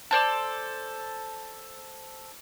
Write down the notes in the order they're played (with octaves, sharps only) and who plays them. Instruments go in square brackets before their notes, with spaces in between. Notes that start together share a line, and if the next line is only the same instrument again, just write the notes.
[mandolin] A4 C5 D5